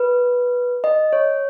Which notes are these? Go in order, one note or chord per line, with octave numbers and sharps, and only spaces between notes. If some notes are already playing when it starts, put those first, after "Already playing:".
Already playing: B4
D#5
C#5